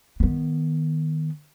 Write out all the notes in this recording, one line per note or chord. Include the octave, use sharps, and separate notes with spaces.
D#3 B3